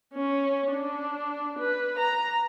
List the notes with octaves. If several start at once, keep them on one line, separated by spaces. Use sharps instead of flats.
C#4
D4
B4
A#5